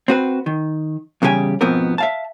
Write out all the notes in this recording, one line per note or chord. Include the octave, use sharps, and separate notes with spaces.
C4 F#4 B4
D#3
E2 C#3 G3 G4 G#5
G#2 B2 F3 B3 C4 A#4
E5 F5 A5